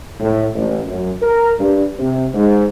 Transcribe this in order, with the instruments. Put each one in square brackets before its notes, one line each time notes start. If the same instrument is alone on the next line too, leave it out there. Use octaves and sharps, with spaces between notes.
[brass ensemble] A2
A1
F#2
A#4
G2
C3
G#2